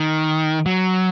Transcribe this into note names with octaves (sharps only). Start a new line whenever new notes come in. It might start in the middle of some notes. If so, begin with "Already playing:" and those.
Already playing: D#3
F#3